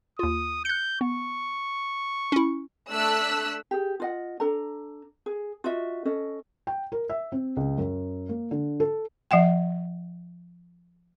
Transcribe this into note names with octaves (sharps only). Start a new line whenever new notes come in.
D#2 F4 D#6
F#6 G6 C#7
B3 C#6
C#4 E4
A3 D4 E6 F#6 B6
G4 G#4
F4 D#5 F#5
D4 A4 A#5
G#4
F4 F#4 D#5 E5
C#4 A4 D#5
G5
A#4
E5
C4
C#2
F#2
A#3
D3
A4
F3 E5 F#5 G5